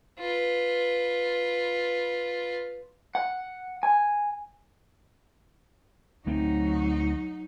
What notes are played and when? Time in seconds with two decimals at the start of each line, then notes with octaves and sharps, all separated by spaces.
0.19 F4 B4
3.15 F#5
3.83 G#5
6.26 D2 F#3 A3 C4 D#4